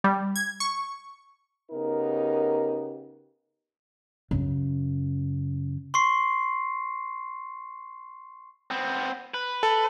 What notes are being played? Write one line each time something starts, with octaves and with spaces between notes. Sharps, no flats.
G3
G#6
C#6
C#3 B3 D#4 G4 A#4
F#2 C#3
C6 C#6 C7
B3 C4
B4
A4